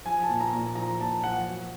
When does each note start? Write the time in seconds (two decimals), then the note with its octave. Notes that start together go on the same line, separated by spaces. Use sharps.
0.05 F3 G#5
0.23 A5
0.29 A#2
0.40 A#5
0.53 A#2
0.75 F3 A#5
1.00 A#2 A5
1.23 F3 F#5
1.47 F#3